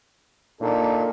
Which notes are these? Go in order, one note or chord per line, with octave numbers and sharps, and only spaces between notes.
A#2 D4 D#4 A4